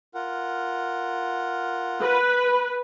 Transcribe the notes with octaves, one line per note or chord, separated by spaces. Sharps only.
F4 A#4 F#5
B4